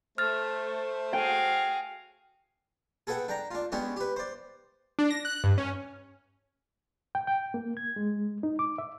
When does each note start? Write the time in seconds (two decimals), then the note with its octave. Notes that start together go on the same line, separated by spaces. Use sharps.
0.18 A3 C5 F6 A6
1.13 F#4 G#4 F5 G5
3.07 G#4 A4 B4 F#5 G5
3.28 D4 G5 A#5
3.51 D4 F4
3.72 G#3 B3 C#4 D4 G4
3.96 G4 B4
4.16 C5 D5
4.99 D4
5.10 A#6
5.25 F#6
5.44 G2
5.58 C#4
7.15 G5
7.27 G5
7.54 A#3
7.77 G#6
7.96 G#3
8.43 D#4
8.59 D6
8.78 E5